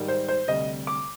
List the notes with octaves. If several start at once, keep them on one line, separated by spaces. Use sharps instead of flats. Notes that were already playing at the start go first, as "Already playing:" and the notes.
Already playing: G#2 D#3 G3
C5
C5
D2 C3 G3 D#5
D6